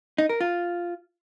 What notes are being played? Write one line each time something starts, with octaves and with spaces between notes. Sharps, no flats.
D#4
A#4
F4